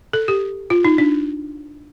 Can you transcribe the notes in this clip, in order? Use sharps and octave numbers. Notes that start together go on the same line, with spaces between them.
A4
G4
F4
D#4
D4